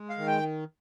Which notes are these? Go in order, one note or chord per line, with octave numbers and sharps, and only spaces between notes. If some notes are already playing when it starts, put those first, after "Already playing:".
Already playing: G#3
F5
D#3
G5